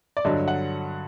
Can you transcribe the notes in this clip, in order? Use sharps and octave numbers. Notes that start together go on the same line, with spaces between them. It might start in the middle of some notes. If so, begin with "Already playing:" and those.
D5
G2 D3 F#3 D#5
F#5